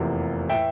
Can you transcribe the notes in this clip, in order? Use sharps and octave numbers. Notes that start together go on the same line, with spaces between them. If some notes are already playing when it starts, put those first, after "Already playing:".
Already playing: F1 E2 C3 F3 A#3
A2 E3 E5 G5